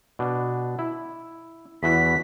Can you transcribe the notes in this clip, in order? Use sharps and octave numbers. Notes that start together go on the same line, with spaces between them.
B2 D4
E4
E2 E3 F#4 B6